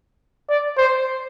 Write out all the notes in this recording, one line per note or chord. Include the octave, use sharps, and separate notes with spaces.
D5
C5